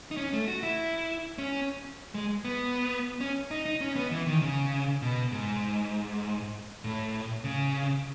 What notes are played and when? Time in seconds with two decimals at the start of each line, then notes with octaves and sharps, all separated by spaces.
0.11 D#4
0.17 C#4
0.33 A3
0.48 F#4
0.63 E4
1.38 C#4
2.14 G#3
2.45 B3
3.21 C#4
3.51 D#4
3.65 D#4
3.81 C#4
3.96 B3
4.11 E3
4.27 D#3
4.42 C#3
5.02 B2
5.32 G#2
6.84 A2
7.44 C#3